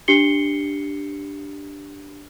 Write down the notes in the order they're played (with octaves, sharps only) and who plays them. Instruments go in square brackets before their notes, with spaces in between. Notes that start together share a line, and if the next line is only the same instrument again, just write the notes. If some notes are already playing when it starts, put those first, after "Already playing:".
[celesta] D4 G4 C7 C#7 G7